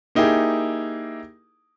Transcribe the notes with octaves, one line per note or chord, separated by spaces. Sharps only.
A#3 D#4 E4 G4 G#4